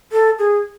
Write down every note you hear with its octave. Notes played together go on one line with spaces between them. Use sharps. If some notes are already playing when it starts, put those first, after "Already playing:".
A4
G#4